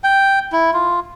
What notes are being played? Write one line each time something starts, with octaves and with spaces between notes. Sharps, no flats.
G5
E4
F4